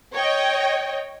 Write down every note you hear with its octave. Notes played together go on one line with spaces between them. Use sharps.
C#5 D#5 G5